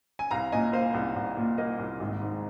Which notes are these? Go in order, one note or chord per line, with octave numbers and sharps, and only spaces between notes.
G#5
C2 F5 A#5
A#2 D#5 G#5
A#3 C5 F5
C2
C2
A#2
A#3 D#5
C2
G#1
G#2